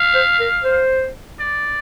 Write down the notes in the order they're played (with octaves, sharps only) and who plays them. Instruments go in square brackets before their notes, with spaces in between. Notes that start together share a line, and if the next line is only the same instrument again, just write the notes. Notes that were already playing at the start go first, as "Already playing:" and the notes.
Already playing: [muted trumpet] F5
[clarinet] C5
A#4
C5
[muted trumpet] D5